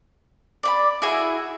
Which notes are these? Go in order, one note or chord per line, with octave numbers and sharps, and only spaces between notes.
D5 E5 B5
E4 F#4 G#4 E5